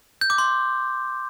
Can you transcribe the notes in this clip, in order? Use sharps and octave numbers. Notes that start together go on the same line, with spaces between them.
G6
D6
C6